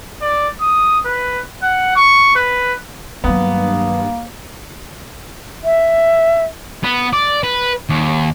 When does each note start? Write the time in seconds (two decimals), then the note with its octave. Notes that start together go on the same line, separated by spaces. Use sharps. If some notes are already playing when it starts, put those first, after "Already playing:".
0.22 D5
0.61 D#6
1.06 B4
1.63 F#5
1.96 C#6
2.36 B4
3.24 G2 D#3 F#3 A#3 B3
5.64 E5
6.84 B3
7.13 D5
7.43 B4
7.89 D#2